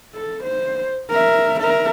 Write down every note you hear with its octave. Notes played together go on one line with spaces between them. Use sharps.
A4
C5
A#4 E5
A#4 E5